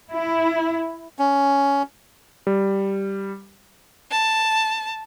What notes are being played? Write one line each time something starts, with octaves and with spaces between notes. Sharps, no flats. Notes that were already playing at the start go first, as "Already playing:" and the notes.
E4
C#4
G3
A5